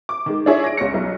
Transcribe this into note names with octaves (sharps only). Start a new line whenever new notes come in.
D6
D#3 G#3
D4 E4 G#4 C#5 D5 E5
A#6 D7
C#2 C#5 A#6 C#7
B1